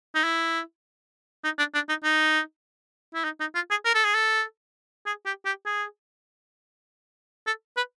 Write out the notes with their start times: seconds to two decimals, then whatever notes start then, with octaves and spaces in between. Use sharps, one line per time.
0.15 D#4
0.24 E4
1.44 D#4
1.58 D4
1.74 D4
1.89 D#4
2.04 D#4
3.14 E4
3.24 D#4
3.40 D#4
3.55 F4
3.71 G#4
3.85 A#4
3.94 A4
4.04 G#4
4.14 A4
5.06 G#4
5.26 G4
5.46 G4
5.66 G#4
7.47 A4
7.77 B4